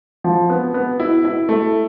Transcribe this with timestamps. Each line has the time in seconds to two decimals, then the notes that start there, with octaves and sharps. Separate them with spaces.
0.24 F3
0.50 B3
0.74 B3
1.00 E4
1.25 E4
1.49 A3